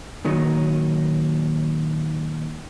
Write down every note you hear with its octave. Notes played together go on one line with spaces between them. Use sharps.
A#2 D#3 F#3 D#4